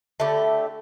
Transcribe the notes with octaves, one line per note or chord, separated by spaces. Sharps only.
D3 A3 E4 G4